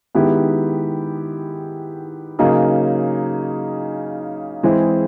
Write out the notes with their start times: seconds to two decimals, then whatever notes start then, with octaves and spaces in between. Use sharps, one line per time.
0.15 D#3 G#3 B3 E4 G4
2.39 C#3 F#3 A#3 D#4 G#4
4.63 E3 G#3 C4 E4 G#4